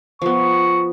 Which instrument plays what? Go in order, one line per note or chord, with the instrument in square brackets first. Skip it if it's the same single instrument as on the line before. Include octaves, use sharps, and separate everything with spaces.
[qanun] F3 B3 [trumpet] C#6